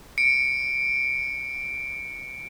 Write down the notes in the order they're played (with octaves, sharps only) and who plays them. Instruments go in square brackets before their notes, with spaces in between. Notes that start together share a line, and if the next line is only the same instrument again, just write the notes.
[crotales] C#7 D7